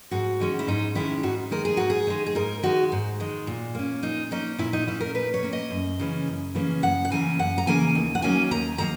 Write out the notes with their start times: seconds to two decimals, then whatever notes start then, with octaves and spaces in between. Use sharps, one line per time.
0.11 G#2 F#4
0.40 D#3 G#3 C#4
0.59 E4
0.67 G#2 D#4
0.95 D#3 G#3 C#4 E4
1.23 G#2 F#4
1.51 D#3 G#3 A#4
1.65 G#4
1.77 G#2 F#4
1.90 G#4
2.07 D#3 G#3
2.26 G#4
2.35 G#2 A#4
2.63 D#3 G#3 F#4
2.92 G#2
3.20 D#3 G#3
3.47 A#2
3.75 A#3 C#4
4.02 A#2 D#4
4.31 A#3 C#4 D#4
4.58 A#2 E4
4.73 D#4
4.87 A#3 C#4 E4
5.01 A#4
5.15 A#2 B4
5.34 C#5
5.42 A#3 C#4
5.53 D#5
5.70 F#2
6.00 C#3 E3 A#3 C#4
6.27 F#2
6.55 C#3 E3 A#3 C#4
6.82 F#2 F#5
7.05 F#5
7.10 C#3 E3 A#3 C#4 G#5
7.39 F#2 F#5
7.58 A#5
7.67 C#3 E3 A#3 C#4 G#5
7.95 D#2
8.15 F#5
8.22 D#3 F#3 A#3 C#4 G#5
8.51 D#2 A#5
8.78 D#3 F#3 A#3 A#5